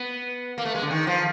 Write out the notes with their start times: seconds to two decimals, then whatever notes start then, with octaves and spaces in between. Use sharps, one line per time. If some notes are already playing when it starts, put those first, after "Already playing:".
Already playing: B3
0.58 A#3
0.65 A3
0.75 G#3
0.82 D3
0.91 D#3
1.07 F3